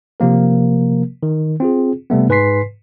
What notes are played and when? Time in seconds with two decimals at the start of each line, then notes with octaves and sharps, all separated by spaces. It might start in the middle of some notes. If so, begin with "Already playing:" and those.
0.20 C3 F3 A#3 A#4
1.23 D#3
1.60 C4 F4 G#4
2.10 C3 G3 A3 B3
2.29 G#2 B4 G#5 C6 B6 C7